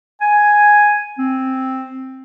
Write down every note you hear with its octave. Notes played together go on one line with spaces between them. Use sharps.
G#5
C4